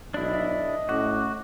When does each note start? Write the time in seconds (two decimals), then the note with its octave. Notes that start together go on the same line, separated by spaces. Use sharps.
0.14 B1 D4 E4 D#5
0.89 A2 C#4 F#4 D6